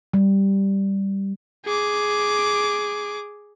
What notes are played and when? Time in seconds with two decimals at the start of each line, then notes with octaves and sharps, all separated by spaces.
0.14 G3
1.66 G#4 D6